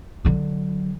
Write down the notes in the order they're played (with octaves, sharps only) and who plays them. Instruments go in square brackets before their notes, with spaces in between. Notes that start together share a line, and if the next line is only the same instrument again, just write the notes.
[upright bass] D3 F#3